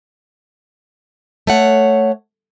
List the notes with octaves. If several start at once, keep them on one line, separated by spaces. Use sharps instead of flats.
A3 C#5 F#5